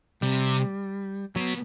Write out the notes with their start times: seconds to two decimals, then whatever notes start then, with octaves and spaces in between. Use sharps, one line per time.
0.22 C3 G3
1.36 B2 F#3